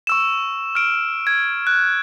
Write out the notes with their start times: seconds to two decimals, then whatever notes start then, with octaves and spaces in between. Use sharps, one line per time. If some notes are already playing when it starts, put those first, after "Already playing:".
0.07 C#6 E6 E7
0.75 F6 D7
1.27 G#6
1.67 F#6